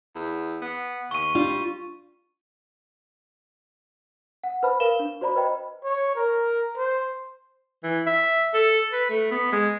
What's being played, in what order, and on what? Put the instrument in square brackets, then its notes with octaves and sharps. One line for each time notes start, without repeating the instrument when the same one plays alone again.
[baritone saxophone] E2
B3
[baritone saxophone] D#2 [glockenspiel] C#6 D#7
[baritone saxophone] G3 [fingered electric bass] D4 [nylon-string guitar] F4
[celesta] F#5
B4 C5 A5 B5 F6
A#4 B4 F5 E7 G7
D4
F#4 C5 D5 A#5 B5
B4 C5 D#5 G5 B5
[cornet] C#5
A#4
C5
[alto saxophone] E3
E5
A4
B4
A3
B3
G#3